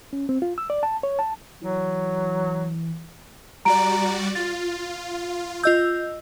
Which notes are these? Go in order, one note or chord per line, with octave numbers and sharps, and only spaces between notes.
C#4
C4
F4
E6
D5
A5
C#5
A5
E3 F#3
G3 F#4 D5 A#5 D7
F4 A6
F4 D#5 E6 G6